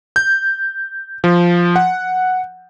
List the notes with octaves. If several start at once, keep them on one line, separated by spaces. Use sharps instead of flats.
G6
F3
F#5